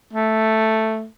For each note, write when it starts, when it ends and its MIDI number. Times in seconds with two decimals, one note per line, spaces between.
0.13 1.06 57